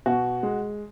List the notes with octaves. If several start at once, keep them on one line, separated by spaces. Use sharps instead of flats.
B2 F#4
G#3